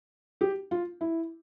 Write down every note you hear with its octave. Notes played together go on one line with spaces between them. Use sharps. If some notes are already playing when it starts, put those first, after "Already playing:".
G4
F4
E4